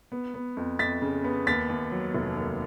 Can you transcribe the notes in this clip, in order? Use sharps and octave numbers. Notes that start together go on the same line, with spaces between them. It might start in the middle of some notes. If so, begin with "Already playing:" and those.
B3
B3
F2
F2 A6 B6
C#3
B3
D#2 A6 B6
D#2
F#3
F1
D#2